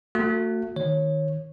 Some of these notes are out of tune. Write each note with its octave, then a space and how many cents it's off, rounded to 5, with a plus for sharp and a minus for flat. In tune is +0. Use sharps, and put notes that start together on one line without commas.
A3 +35 F#4 -15
D#3 +0 C#5 -15